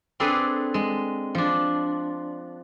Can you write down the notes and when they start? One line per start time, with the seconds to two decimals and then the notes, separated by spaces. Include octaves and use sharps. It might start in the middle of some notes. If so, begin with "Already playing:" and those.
0.20 C4 D4 G#4 A4 B4
0.74 G#3
1.35 F3 D4